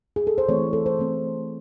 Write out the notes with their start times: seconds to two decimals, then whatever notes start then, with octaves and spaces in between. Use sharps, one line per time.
0.16 G#4
0.27 A4
0.38 C5
0.49 E3 A3 C4 C#5
0.73 A4
0.86 C5
0.99 E3 A3 C4 C#5